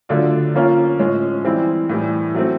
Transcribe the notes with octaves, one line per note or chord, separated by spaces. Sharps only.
D3 F#3 A3 D4 F4
F3 A#3 C#4 F4
A2 F3 G#3 C#4
E3 G3 C4 E4
A2 E3 G3
F#3 A3 C4